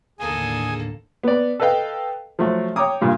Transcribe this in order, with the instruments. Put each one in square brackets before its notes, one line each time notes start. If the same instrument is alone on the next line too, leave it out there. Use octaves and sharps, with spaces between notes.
[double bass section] D#2 A2 D3 [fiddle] A#3 A4 [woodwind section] G#4 [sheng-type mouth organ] G#5
[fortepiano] B3 D5
A4 B4 D#5 F5 G5
F3 F#3 A3 F#4
C#5 G5 A#5 D6 D#6
G2 A#2